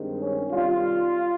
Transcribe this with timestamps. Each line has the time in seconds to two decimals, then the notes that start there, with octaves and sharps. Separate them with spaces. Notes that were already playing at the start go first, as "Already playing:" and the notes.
Already playing: G2 D#3 G#3 C4
0.20 C#4
0.50 C3 D#3 G3 F4